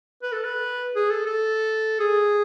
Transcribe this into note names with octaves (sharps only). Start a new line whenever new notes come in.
B4
A4
B4
G#4
A4
A4
G#4